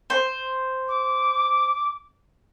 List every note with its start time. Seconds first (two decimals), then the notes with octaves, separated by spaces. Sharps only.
0.10 C5
0.88 D6